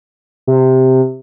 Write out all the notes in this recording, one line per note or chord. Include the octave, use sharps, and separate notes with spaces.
C3